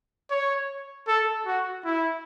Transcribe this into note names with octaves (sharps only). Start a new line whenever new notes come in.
C#5
A4
F#4
E4